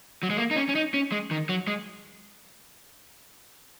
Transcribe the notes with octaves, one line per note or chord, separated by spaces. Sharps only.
F#3
G#3
A#3
D#4
C#4
C#4
D#4
C#4
G#3
D#3
F#3
G#3